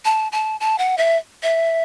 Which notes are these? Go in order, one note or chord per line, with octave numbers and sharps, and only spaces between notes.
A5
A5
A5
F#5
E5
E5